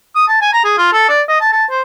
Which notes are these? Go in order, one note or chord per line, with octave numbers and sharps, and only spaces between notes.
D#6
A5
G#5
A#5
G#4
F4
A4
D5
D#5
A5
A5
C5